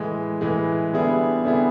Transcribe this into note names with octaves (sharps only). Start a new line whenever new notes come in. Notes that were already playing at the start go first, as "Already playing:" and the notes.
Already playing: A2 E3 G#3
A2 E3 G#3
D3 G3 B3 E4 G#4
D3 G3 B3 E4 G#4